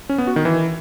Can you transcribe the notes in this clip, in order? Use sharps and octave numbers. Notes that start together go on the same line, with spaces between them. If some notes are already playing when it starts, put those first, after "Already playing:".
C#4
B3
F#4
D#3
E3